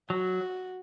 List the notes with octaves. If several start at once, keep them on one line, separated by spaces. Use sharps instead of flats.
F#3 F#4